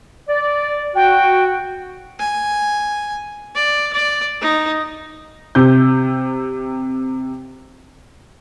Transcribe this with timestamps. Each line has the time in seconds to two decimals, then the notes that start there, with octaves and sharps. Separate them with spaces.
0.28 D5
0.95 F#4 G5
2.19 G#5
3.56 D5
3.93 D5
4.41 D#4
5.55 C3 G6